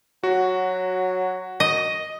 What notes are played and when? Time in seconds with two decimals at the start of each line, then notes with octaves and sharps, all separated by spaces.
0.23 F#3 F#4
1.60 D#5